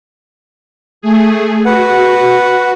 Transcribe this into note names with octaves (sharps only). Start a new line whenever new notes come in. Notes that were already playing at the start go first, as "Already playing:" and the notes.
A3 G#4
F#4 B4 F#5